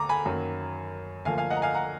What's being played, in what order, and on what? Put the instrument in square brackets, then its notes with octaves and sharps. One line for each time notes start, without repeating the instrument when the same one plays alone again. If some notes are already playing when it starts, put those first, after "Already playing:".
Already playing: [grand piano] D2 A#5 D6
G#5 B5
F#2 D#3 F#3 A#3
D2 D3 F3 A#3 F5 G#5
F5 G#5
D#5 F#5
A#5
F5 G#5
F#5 A#5